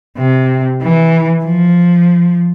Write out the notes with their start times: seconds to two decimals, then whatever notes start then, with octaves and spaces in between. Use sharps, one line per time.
0.18 C3
0.82 E3
1.45 F3